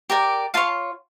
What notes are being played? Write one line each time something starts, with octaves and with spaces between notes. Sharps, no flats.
G4 A#4 D5
F4 C#5 F5 A5